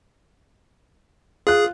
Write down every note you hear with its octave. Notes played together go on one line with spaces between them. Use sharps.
F4 G#4 F#6